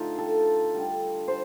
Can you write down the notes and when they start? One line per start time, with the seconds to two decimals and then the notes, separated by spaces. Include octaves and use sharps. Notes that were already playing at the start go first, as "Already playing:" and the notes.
Already playing: D3 A3 D#4 F4
0.18 A4
0.74 D3 G3
1.28 C5